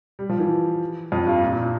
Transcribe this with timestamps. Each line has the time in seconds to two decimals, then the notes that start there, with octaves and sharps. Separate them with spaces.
0.19 G3
0.29 F3
0.40 E3
1.12 F2
1.26 G2
1.42 A#2
1.52 A#2
1.62 A#2